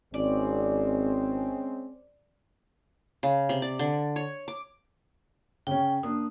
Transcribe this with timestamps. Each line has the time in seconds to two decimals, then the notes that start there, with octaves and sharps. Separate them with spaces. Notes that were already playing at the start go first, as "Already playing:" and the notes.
0.14 G#1 G#3 C4 C#4 D5
3.23 C#3
3.49 C3
3.62 D5
3.79 D3
4.16 C#5
4.48 D6
5.67 C#3 C#4 G5
6.03 A#3 D4 D#6